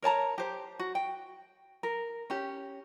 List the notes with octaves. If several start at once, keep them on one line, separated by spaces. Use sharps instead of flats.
A#4 C#5 A5 A#5
G4 C5
F#4
G5
A#4
C#4 G4